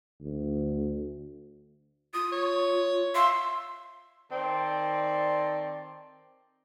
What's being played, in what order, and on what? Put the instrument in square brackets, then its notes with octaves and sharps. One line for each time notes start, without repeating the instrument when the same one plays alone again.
[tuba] D2
[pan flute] F4 [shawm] D#6
[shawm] C#5
[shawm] E5 [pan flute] F5 [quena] C6
[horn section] D#3 C4 A4 D5